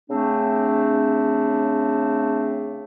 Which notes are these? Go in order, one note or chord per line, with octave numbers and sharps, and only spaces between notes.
C#3 A3 C4 D4